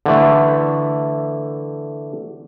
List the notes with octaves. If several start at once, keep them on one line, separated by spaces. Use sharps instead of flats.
D3 E3 A3